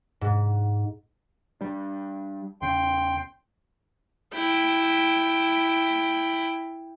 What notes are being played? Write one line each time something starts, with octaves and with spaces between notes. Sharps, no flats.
G#2
G3 D4
E2 C#3 G5 C6
E4 G5